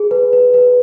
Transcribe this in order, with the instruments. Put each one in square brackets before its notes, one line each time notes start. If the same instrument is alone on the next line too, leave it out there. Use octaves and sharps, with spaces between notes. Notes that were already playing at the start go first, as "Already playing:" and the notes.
Already playing: [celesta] G#4
B4
B4
B4